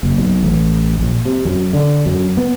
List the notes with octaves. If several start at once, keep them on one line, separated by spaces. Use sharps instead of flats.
F#1
B1
A1
A#1
C3
F#2
D3
F#2
B3